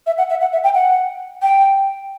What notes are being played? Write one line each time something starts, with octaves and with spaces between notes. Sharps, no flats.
E5
F#5
E5
F#5
E5
G5
F#5
G5